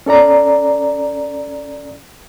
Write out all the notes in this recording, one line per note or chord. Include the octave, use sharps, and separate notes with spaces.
C#4 A4 D5 A#5